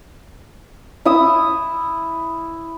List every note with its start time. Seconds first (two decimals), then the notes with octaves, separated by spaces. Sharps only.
1.05 E4 E5 D#6